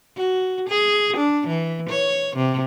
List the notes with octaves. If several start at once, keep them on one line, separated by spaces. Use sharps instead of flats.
F#4
G#4
D4
E3
C#5
C3